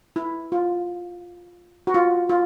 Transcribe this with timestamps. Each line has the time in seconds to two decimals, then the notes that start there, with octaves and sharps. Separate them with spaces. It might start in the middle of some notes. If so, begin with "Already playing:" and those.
0.16 E4
0.52 F4
1.87 F#4
1.94 F4
2.29 F4